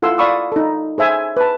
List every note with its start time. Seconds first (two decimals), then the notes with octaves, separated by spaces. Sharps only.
0.02 E4 F4 A4 F#5 C6 E6
0.18 D5 F5 B5 C#6 D#6 E6
0.52 D#4 A4
0.98 G#4 C5 E5 G#5
1.37 B4 A5